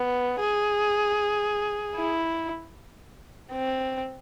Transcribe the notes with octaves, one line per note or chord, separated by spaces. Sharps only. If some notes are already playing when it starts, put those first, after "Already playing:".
Already playing: B3
G#4
E4
C4